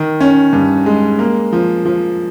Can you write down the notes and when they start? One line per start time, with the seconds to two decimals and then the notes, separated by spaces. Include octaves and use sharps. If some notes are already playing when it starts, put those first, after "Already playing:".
Already playing: D#3
0.20 C#4
0.53 G2
0.86 G#3
1.19 A#3
1.52 F3
1.85 F3